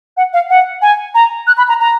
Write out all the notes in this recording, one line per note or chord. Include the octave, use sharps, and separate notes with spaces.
F#5
F5
F#5
G#5
A#5
F#6
B5
A#5
A#5